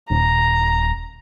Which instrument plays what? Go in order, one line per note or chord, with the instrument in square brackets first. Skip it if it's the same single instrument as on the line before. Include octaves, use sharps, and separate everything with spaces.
[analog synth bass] D#1 [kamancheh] A#5